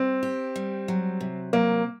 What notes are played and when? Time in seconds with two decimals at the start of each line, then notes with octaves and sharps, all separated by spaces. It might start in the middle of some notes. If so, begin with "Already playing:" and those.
Already playing: G3 C4
0.23 G4
0.56 G3
0.88 F#3
1.21 C3
1.53 F#3 A#3